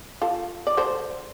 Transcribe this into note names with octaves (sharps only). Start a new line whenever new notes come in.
F4 A4
D5
A4 C5